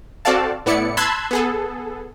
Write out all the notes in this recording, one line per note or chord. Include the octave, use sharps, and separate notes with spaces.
C4 F#4 A4 D5 F5 A5
A2 B3 E4 D5 C#7
A5 B5 C6 E6 F#6 G#6
B3 G#4 A4